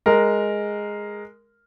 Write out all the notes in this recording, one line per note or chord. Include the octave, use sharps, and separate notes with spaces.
G#3 A#4